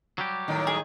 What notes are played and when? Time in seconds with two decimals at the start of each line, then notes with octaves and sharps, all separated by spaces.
0.18 F#3 G3 G4
0.48 A2 D#3
0.67 G#4